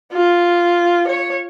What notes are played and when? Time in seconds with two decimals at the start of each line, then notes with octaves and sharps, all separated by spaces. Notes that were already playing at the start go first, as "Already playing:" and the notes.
0.13 F4
1.07 C#5